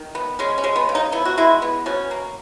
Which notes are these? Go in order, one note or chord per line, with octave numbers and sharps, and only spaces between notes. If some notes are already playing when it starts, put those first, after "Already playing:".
Already playing: D#3
B3
G#3 C#4
C#4
G#3
B3
C#3
D#4
B3 E4
F#4
G#3 E4
B3
B2 C#4
A#3